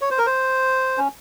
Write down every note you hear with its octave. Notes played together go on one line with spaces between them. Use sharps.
C#5
C5
A#4
C5
C#4